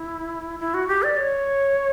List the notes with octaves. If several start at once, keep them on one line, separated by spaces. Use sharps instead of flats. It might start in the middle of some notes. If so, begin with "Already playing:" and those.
Already playing: E4
E4
F#4
G4
D5
C#5